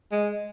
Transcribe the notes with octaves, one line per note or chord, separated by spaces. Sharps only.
G#3